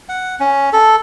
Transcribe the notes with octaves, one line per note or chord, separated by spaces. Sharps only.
F#5
C#4
A4